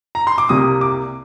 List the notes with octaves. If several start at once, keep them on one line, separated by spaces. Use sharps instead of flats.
A#5
C6
D6
C2 C3 G3 A#3 D#6
D6